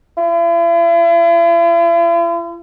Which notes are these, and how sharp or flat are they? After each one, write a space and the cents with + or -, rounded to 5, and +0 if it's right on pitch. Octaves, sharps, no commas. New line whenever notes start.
E4 +45